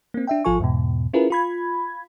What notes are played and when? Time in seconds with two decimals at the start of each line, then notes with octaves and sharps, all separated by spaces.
0.14 A#3 C4
0.27 D4 E5 G5
0.45 G#1 F3 F4 A4 G#5 C#6
0.59 E2 G#2 B2
1.13 C#4 E4 F4 G#4 A#4 B4
1.30 F4 B5 G#6